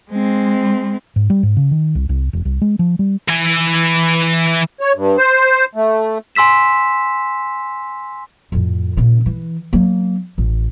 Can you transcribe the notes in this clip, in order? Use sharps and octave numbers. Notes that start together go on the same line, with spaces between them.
G#3 C4
G#2
G3
G#2
C#3
D#3
C2
C2
E1
C2
G#3
F3
G3
E3 G#5
C#5
G2
C5
A3
G#5 C6 E6 B6 E7
F2 A2
A#2 C#3
E3
F#3 A#3
A1